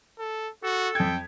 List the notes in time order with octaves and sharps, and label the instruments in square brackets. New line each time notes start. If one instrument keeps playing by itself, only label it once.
[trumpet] A4
[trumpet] F#4 [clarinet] A4
[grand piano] F2 G#6 [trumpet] G5